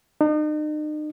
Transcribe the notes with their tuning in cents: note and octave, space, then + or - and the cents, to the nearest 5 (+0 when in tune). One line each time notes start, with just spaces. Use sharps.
D#4 -40